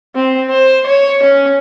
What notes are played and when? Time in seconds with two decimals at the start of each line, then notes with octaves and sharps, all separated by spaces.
0.16 C4
0.50 C5
0.87 C#5
1.23 C#4